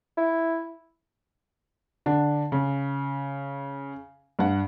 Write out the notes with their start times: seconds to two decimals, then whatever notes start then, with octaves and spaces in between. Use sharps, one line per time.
0.17 E4
2.06 D3 D4
2.52 C#3
4.39 G2 F#5